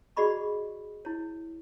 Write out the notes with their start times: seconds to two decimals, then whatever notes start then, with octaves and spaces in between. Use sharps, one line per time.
0.17 F#4 G#4 D5 D#5 B5 C#6
1.05 E4 C#5